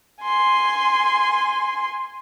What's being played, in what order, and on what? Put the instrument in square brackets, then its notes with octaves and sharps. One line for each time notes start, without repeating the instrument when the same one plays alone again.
[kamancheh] G#5 C6